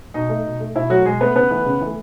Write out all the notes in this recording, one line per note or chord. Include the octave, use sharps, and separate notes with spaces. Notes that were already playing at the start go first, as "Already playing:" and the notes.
B2 D#4
A3
B2
A3
B2 E4
F#3 A3 F#4
B2 G#3 G#4
A3 B3 B4
C#3 B3 B4
E3 A3
C#3
E3 A3